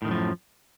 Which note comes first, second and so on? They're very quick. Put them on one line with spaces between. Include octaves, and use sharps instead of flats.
A2 D#3 F#2 F3